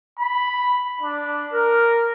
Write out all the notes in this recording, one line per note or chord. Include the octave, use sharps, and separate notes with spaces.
B5
D4
A#4